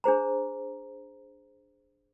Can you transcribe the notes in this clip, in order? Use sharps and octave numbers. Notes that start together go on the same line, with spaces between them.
D4 G#4 C5 A#5